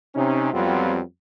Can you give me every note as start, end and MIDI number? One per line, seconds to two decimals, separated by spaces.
0.16 0.53 48
0.16 0.53 61
0.16 0.53 63
0.54 1.00 41
0.54 1.00 54
0.54 1.00 55
0.54 1.00 59
0.54 1.00 60
0.54 1.00 65